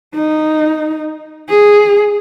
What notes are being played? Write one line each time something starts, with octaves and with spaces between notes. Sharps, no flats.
D#4
G#4